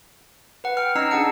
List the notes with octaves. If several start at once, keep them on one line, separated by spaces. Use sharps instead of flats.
B4 F#5
G5 F6
C#4 D#4 D#5 A#5 E6 C7
D4 G#4 F#5 A5 C#7